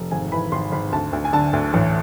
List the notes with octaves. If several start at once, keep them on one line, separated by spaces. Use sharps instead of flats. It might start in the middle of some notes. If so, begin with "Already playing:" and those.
Already playing: F1
G#1 G#5
E3 B5
G#1 C6
G#1 B5
D2 A5
D2
G#5
D3 A5
D2
A1